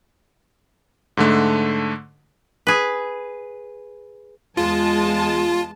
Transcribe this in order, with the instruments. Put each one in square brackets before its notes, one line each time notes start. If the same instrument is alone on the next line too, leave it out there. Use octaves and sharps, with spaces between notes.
[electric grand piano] G#2 D3 A3
[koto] G#4 B4
[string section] E2 G#3 A5 [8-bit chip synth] F4